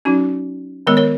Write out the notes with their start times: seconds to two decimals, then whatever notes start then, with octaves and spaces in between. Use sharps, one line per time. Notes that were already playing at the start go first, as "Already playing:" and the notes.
0.05 F#3 C#4 D#4 F#4
0.87 D#3 G#3 B3 A#4 C#5
0.97 A#4 C#5